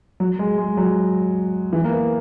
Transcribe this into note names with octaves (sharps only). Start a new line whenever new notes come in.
F#3
G#3
G#3
F#3
E3
A#3
B3